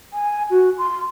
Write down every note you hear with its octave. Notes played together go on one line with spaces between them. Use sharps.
G#5
F#4
C6